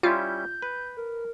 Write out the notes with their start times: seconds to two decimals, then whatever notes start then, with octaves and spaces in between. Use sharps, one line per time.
0.03 G3 C#4 E4 F4 G6
0.62 B4
0.97 A#4